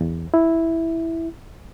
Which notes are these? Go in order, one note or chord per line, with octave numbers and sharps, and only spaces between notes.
E2
E4